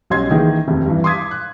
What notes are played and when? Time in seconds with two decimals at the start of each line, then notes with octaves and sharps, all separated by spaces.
0.10 B1 G3 C#4 D#5 C6 G#6
0.30 D#3 E3 A#3 D#4 G#4 D#5
0.67 F1 D#2 C3
0.86 G2 E3
1.04 C6 D6 D#6 G#6 B6
1.31 F#6